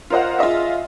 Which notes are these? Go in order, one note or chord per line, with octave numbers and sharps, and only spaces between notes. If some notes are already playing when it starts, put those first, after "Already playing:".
F4 A#4 C5 D#5 F#5
F4 G#4 D#5 E5